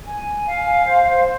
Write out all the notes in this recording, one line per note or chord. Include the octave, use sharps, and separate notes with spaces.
G#5
F5
C5